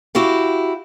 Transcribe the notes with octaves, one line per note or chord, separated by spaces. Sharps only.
E4 F#4 G4 F5